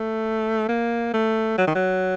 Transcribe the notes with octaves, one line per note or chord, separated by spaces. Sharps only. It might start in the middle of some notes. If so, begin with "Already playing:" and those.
Already playing: A3
A#3
A3
F#3
D#3
F#3